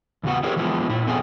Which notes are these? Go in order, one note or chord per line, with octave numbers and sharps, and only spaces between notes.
E2 C#3 B3 F#4 F#5
E4 G4 G#4 A#4 C5 C#5
E3 F3 G#3 B3 E4
A#2 E4
F2 B2 C4 G#4 A4 G#5